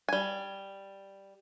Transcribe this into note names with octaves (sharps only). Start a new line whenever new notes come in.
G3 G#5